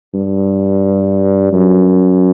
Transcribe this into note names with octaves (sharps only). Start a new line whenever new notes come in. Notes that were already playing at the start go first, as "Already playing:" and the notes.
G2
F#2